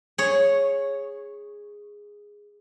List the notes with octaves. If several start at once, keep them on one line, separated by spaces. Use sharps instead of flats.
G#4 C#5